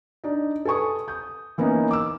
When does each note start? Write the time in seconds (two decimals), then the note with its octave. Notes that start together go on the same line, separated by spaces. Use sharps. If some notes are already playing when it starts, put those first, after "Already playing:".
0.24 D4 D#4
0.65 A4 B4 G#5 C#6 D#6
1.08 D#6 G6
1.58 E3 A#3 B3 C#4 D#4
1.91 D6 E6